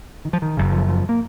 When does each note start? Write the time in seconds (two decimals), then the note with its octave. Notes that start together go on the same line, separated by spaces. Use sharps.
0.25 D#3
0.33 F3
0.42 D#3
0.57 F#1 F#2 C#3
0.72 F3
0.88 F3
1.09 A#3